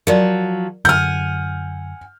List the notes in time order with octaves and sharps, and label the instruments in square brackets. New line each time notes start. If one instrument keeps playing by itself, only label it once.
[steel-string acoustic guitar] F3 F#3 [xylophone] A#4 D5
[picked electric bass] F#2 D3 [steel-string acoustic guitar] F#5 G#5 [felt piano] F6 G6